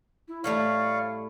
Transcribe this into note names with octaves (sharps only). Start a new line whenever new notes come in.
E4
A2 G3 A3 C#5 D5 F5